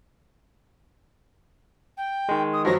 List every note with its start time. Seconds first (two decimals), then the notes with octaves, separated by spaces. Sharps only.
1.97 G5
2.29 D#3 G#3
2.53 D#6
2.65 G2 F3 F#3 A#6